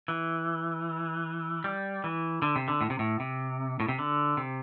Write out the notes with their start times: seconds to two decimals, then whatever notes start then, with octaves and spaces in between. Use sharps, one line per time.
0.08 E3
1.64 G3
2.04 E3
2.42 D3
2.56 C3
2.68 D3
2.81 A2
2.90 C3
2.99 A2
3.20 C3
3.80 A2
3.88 C3
3.99 D3
4.37 C3